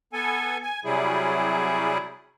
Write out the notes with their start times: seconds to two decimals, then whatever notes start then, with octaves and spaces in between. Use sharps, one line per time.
0.13 B3 A4 G#5
0.63 G#5
0.85 C3 F#3 G3 E4 G#4